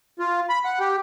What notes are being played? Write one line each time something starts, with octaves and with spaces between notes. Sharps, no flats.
F4
B5
F#5
G4